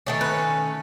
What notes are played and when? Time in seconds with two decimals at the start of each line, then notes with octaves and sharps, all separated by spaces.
0.06 D#3 A3 C#4
0.21 B4